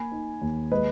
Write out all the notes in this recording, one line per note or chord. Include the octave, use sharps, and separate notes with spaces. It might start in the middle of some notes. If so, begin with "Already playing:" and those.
Already playing: A#3 G#5 B5
D#4
D#2
G#3 B4 D#5